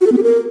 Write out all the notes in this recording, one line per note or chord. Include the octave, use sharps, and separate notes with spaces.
F#4
A4
B3
G4
A#4